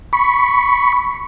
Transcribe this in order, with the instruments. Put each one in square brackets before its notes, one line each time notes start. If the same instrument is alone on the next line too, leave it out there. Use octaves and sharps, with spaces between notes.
[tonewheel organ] B5 C#6